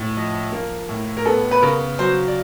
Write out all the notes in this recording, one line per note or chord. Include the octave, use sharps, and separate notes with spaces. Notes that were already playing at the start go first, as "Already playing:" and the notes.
Already playing: A2
F3 D#5
A#3
A2
A#4
B3 A4
B4
C#3 A#4
F#3 C5
D5